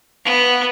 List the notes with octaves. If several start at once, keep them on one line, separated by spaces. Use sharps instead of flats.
B3